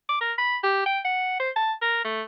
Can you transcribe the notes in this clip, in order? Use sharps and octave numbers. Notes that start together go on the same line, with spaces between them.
D6
A#4
B5
G4
G5
F#5
C5
A5
A#4
A3